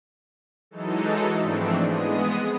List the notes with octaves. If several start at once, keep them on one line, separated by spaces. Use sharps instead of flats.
E3 F#3 G#3 D#4 A4
G#2 E3 F3 A3 C4 D4
G#3 B3 D#6